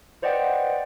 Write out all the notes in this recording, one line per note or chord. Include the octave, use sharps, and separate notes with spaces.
B4 C5 D5 D#5 F#5 G5